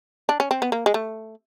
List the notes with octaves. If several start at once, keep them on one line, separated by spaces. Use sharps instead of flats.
D4
C#4
C4
B3
A#3
G#3
A3